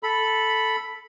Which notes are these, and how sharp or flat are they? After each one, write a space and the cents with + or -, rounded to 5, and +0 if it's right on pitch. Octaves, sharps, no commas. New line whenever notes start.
A4 +0 B5 +0